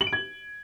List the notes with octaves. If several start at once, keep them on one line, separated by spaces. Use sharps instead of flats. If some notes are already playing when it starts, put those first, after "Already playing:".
F#7
D7
G#6